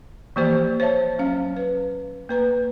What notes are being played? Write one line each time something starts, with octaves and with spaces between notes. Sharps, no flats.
E3 F3 A#3 G4 C5 D5
C5 C#5 E5 A5
F#3 C#4 F5
B4
A#3 B4 A#5